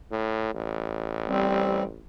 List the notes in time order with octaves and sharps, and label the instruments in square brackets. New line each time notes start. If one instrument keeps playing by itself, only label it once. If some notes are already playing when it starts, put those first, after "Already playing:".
[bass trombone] A2
A1
[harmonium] G3 C4